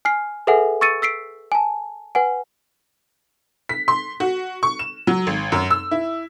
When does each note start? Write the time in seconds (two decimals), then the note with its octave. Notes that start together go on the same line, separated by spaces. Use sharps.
0.05 G#5 F6 C7
0.47 G#4 A4 B4 E5 F#5 G#5
0.81 C#6 E6 A6 C#7 D#7
1.02 E6 B6 C7 D7
1.52 G#5 A5
2.15 B4 F#5 G#5
3.69 B6
3.88 C6
4.20 F#4
4.63 C#6
4.79 E7
5.07 F#3
5.27 G#1
5.52 F#2
5.70 E6
5.91 E4